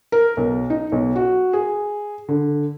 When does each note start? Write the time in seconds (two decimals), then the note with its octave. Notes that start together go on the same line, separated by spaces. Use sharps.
0.12 A#4
0.37 B1
0.70 D#4
0.92 B1
1.16 F#4
1.53 G#4
2.28 D3